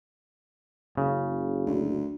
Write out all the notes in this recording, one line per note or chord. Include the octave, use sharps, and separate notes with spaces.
F#1 C#3
D2